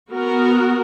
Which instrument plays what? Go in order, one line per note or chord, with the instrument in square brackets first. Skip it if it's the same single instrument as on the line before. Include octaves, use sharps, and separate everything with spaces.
[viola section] B3 F#4 A#4